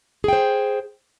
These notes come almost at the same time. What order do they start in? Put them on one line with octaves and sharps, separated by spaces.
G#4 G5 C5